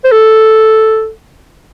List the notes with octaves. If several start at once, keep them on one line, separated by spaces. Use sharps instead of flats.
C5
A4